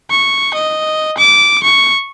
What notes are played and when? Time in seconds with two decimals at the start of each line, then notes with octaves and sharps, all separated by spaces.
0.11 C#6
0.54 D#5
1.18 D6
1.64 C#6